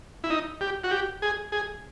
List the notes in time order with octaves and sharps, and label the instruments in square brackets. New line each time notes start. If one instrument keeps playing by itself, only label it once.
[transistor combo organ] E4
D#4
G4
F#4
G4
G#4
G#4